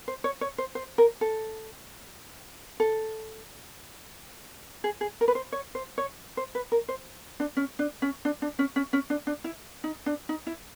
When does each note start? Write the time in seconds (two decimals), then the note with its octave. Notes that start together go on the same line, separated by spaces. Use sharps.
0.08 C5
0.24 C#5
0.41 C#5
0.58 C5
0.75 C5
0.98 A#4
1.21 A4
2.80 A4
4.84 G#4
5.01 G#4
5.21 A#4
5.28 B4
5.35 C5
5.52 C#5
5.75 C5
5.98 C#5
6.37 C5
6.55 B4
6.72 A#4
6.89 C5
7.40 D4
7.57 C#4
7.79 D4
8.02 C#4
8.25 D4
8.42 D4
8.59 C#4
8.76 C#4
8.93 C#4
9.10 D4
9.27 D4
9.44 E4
9.84 D#4
10.06 D4
10.29 D#4
10.47 E4